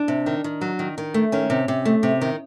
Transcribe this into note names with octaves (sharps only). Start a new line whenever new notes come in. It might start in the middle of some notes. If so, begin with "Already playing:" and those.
Already playing: D4
C3
D#3
D#3
F#3
D#3
D#3
A3
D#3 C#4
C3
C3
A3
C3
D#3